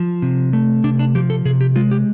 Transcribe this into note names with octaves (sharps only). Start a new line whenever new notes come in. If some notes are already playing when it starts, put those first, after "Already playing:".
Already playing: F3
C3
A3
C3 D4
D4
F3 G4
A4
C3 G#4
G4
G#3 F4
G4